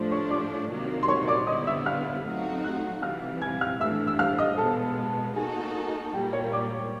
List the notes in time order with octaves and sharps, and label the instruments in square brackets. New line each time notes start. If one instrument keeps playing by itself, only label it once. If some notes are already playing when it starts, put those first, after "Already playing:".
Already playing: [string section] A2 F3 A3 D4 [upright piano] C5 C6
[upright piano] C#5 C#6
D5 D6
[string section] C3 D#3 F#3 A#3
[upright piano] C6
C#5 C#6
D5 D6
[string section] D3 G3 B3 E4 [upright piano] D#5 D#6
[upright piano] E5 E6
F5 F6
[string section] F#3 A3 C4 D#4 F#4
[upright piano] F#5 F#6
[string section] C3 E3 G3 [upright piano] F5 F6
[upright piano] G#5 G#6
F5 F6
[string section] A2 E3 A3 D4 [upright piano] E5 E6
[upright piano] E6
F5 F6
D#5 D#6
[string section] B2 G#3 B3 [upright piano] A4 A5
[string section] A#3 D#4 F#4 A4 [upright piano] G#4 G#5
[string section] A#2 G3 A#3 [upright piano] G4 G5
[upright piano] C#5 C#6
D5 D6